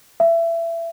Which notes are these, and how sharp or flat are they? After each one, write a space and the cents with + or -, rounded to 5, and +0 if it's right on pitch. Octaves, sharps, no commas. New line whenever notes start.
E5 +25